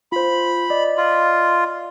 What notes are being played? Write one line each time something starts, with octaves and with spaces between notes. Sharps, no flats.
F4 C5 B5
D5 D#5
F4